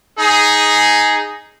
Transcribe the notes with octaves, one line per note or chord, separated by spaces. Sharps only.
D#4 G#4